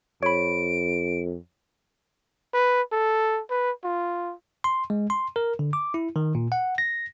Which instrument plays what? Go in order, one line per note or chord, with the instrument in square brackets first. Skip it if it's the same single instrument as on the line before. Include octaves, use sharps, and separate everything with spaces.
[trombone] F2 [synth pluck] C#5 B5 [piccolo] D7
[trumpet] B4
A4
B4
F4
[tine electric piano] C6
G#3
C6
A#4
D3
D6
E4
D#3
A#2
F#5
A#6